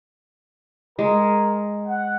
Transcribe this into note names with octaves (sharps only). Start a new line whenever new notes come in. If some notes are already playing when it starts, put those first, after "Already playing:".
G#3 G#4 A#4
F#5